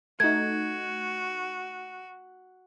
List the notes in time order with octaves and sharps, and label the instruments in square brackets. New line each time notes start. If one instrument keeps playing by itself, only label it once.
[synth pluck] A3 D#4 [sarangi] F#4 [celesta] G#6